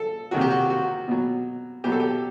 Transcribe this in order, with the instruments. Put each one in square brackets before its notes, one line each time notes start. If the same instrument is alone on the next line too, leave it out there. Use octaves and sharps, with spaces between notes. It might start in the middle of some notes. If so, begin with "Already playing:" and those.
Already playing: [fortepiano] A4
C3 D#3 F#3 F#4
G4
F#4
F#4
B2 F#3
B2 F#3 G4
A4
G4